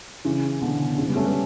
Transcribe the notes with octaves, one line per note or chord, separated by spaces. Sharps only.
C#3 E3
B2 D3
C#3 E3
G3 B3
A3 C#4
G3 B3